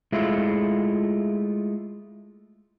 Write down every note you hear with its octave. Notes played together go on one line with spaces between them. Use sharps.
G#3 A3 E4 F4